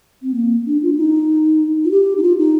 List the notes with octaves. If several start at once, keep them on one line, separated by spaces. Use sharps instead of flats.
C4
A#3
D4
F4
D4
D#4
F4
G4
D#4
F4
D#4